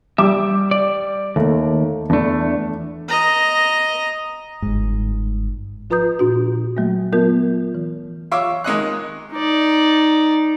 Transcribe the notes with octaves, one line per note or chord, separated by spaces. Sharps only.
G3 E5 D6
D5
D#2 A3
E2 A3 D4
D#5 A#5
G1 G#2
F3 F4 B4 A#5 D#6 G6
A#2 D4 F#4
F#3 A3 A#3
F#3 B3 F4 A#4 G6
E3
F4 C#5 E5 D6
D#3 G#3 D#5 F#6
D#4 D5